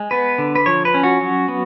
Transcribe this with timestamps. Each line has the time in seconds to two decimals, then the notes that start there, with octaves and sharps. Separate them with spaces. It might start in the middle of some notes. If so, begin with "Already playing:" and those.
Already playing: G#3
0.11 B3 B4
0.38 D3
0.55 B4
0.66 F3 C#5
0.85 B4
0.94 C#4
1.03 F#4
1.21 F#3
1.48 B3